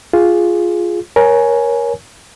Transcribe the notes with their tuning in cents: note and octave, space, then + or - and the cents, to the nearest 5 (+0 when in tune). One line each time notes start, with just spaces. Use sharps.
F4 +0 G#4 +0
A#4 +20 C#5 +0 G#5 +10